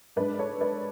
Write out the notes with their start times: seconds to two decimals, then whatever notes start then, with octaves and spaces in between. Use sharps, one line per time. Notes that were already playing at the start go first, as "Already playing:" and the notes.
0.16 G#2 G#3 D4 B4 D5
0.39 A4 C#5
0.61 B4 D5